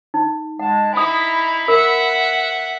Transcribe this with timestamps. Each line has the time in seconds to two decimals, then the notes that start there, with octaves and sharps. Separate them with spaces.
0.14 D#4
0.59 G#3 F#5 A5
0.93 D#4 E4 G#5 B5 D#6
1.68 A#4 E5 F#5